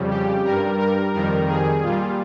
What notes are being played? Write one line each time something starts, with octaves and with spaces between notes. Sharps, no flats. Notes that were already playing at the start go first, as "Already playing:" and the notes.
Already playing: F2 C#3 G3
G4
G2 G3 A#4
A#4
F2 D#3 G3 A#4
G#4
A#2 G3 F4